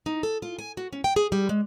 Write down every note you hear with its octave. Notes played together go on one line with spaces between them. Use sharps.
D#4
A4
F4
G#5
F#4
C#4
G5
G#4
G3
G#3